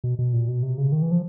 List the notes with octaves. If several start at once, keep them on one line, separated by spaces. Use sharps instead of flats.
B2
B2
A#2
B2
C3
C#3
D#3
E3
F3